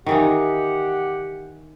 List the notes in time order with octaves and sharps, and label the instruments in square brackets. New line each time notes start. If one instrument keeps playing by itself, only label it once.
[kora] D#3 E3 D#4 [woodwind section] G4 F#5